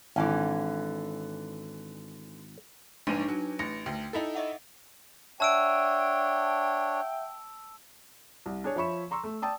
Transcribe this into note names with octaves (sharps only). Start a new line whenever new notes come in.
G#1 D3 E3 C#4
A#1 G#2 D4 D#4 B4 D#7
F#3
A1 A#6 C#7
D2 G5
D#4 E4 A4
D#5 E5 F#5
D4 C#5 E5 F#5 G5 A5 E6 D7
C2
D4 G#4 C#5
F3 C#5 E5 B5 C#6 E7
A#5 C6 C#6 E6
A3
D5 G5 A5 D#6 E6